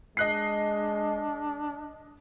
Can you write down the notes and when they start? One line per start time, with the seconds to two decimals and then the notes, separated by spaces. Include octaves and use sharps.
0.17 G#3 D4 D#5 F#6 C7